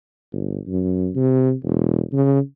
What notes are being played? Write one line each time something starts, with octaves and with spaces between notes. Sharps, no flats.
G1
F#2
C3
E1
C#3